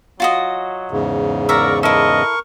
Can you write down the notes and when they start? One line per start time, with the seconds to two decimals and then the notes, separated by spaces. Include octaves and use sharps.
0.20 F#3 F4 F#4 D#5
0.91 E2 G#2 C#3
1.49 A#4 D5 E5 A#5 C#6
1.83 E4 A4 A#4 D#5 C#6